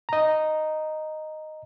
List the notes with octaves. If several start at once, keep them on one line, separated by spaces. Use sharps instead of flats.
D#5 A#5